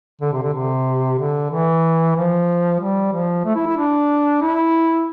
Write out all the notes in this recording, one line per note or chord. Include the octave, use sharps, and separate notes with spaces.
D3
C3
D3
C3
D3
E3
F3
G3
F3
A3
E4
E4
D4
E4